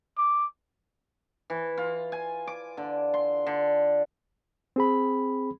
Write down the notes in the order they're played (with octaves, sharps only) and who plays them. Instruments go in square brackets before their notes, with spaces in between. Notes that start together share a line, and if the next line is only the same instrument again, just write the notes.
[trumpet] D6
[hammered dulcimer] E3
F4
G#5
D6
D3
C6
D3
[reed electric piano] C4 G#4 B5